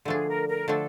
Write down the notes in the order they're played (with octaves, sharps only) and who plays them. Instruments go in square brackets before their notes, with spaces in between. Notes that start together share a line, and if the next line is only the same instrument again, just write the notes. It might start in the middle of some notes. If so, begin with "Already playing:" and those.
[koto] D3 F3 A3 D4 [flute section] G#4
[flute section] A#4
A#4
[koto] D3 F3 A3 D4 [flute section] A4